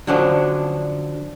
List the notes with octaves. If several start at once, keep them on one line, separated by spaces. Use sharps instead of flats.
D3 F3 F#3 C#4 D4